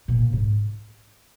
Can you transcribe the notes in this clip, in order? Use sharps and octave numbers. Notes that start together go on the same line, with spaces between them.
A#2
G#2